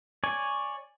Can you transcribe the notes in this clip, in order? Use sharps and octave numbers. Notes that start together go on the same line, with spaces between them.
C#5 D5 G#5